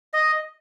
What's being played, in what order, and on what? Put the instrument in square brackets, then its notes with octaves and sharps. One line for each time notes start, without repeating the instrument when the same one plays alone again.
[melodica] D#5